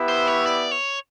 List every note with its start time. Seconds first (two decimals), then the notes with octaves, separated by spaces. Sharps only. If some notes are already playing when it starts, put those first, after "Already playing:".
Already playing: B3 E4 G4 B4 E5
0.08 C5
0.28 C#5
0.46 D5
0.71 C#5